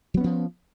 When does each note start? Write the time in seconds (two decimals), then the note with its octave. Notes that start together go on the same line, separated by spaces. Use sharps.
0.14 F#3
0.17 B3
0.21 C#4
0.24 F3